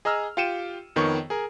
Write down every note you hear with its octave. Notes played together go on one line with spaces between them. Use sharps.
G#4 D#5 A#5 E6 F6
F4 G4 G5 C#7 D#7 E7
F2 D#3 B3 C#5 C#6
G#4 A#4